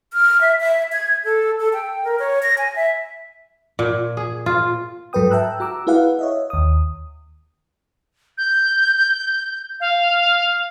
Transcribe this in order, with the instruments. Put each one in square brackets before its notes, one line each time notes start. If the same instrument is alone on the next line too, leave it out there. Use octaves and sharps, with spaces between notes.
[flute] F6
E5
E5
G#6
A4
A4
G5
A#4
C#5
A#6
G#5
E5
[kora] A#2
G#4
F4
[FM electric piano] G#2 F#3 A4 B4 G5 D#6
E5 G5 A5 A#5 E6 F#6
F#4 A#5 D6 E6
E4 G#4 B4 F5 F#5
C#5 D#5 E5
D#2 D#6
[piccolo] G6
F5